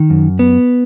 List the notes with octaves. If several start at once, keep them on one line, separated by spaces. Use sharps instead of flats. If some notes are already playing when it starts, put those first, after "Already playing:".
Already playing: D#3
F#2
B3